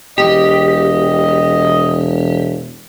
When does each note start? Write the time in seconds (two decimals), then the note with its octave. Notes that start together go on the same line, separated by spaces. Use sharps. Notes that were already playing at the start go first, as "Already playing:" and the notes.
0.18 E1 G4 D#5